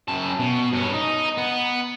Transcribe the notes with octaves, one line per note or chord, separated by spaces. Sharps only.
F#2 A5
B2
G2 C#4
D#4
B3